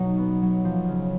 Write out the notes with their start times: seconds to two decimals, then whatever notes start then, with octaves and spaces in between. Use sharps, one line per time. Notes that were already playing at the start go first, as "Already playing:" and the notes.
Already playing: B2 F#3 D#4
0.18 B3
0.42 F#3
0.65 F3
0.88 C#3